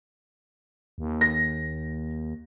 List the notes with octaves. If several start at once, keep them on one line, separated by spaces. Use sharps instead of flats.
D#2
A#6